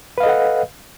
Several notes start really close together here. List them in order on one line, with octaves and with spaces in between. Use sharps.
B4 F5 D#5 A4 F#5